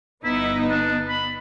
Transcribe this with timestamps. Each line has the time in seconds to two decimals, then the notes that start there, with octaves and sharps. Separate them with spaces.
0.24 G1 B3 D#4 E4
0.70 D4
1.09 B5